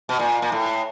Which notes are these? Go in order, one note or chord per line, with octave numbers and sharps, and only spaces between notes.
B2
A#2
A#2
A2